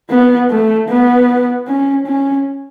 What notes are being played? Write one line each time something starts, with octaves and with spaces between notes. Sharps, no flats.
B3
A3
B3
C#4
C#4